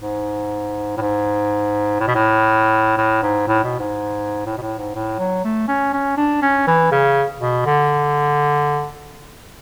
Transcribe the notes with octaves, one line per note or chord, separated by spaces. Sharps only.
G#2
A2
G#2
A2
B2
A2
A2
G#2
A2
B2
G#2
A2
B2
A2
G#2
A2
F#3
A3
C#4
C#4
D4
C#4
E3
C#3
B2
D3